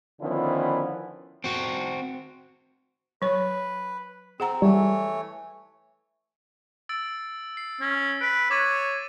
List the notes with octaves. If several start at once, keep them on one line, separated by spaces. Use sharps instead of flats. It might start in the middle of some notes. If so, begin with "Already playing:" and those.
D3 D#3 F3 B3 C#4 E4
C4 F#4
F#3 B4 C#5
C4 G#4 F#5 A#5
E3 G3 A3 C#5
E6 A6 D7
C7
C#4
B4 D7
C#5 D6 A6 D#7